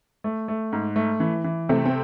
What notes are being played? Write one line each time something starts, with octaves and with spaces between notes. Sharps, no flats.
A3
A3
G#2
A3
E3
E3
C3 A3 C4
C4